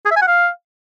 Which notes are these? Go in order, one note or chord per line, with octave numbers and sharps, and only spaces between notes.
G#4
E5
G#5
F#5
F5